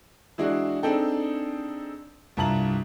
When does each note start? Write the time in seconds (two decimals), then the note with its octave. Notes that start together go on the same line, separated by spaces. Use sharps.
0.38 E3 G#3 D4 E4 F#4
0.83 C4 D4 D#4 G#4 A4 G5
2.37 C2 G2 F4 A5 A#5 F#7